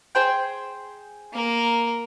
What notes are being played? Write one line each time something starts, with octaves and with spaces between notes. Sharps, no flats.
G#4 C5 G5
A#3 A#4